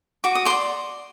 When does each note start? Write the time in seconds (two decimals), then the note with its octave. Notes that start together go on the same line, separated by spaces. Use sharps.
0.24 F#4 D6
0.35 D#6
0.45 D5 C6 D6